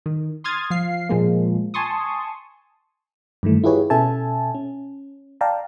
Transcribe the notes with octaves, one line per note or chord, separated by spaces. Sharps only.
D#3
C6 D#6 F6 G#6 A6
F3 F5 C7
A#2 F3 G#3 A#3
G#5 A5 C6 C#6 D#6
G2 D#3 E3 A3
E4 F4 G4 G#4 B4 C#5
B2 C#4 A4 E5 G#5 A5
C#4
D5 F5 G5 A5 A#5